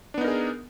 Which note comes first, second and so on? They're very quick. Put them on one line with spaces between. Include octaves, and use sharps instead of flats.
D4 B3 D#4 A#4 G#4